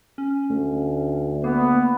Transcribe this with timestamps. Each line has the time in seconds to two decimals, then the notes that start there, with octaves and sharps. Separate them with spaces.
0.18 C#4
0.50 D2 A3
1.44 A#3 B3